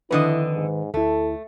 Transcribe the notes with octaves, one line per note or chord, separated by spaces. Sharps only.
F2 D3 D#3 E4 B4 D#5
G#2
D2 A3 E4 A4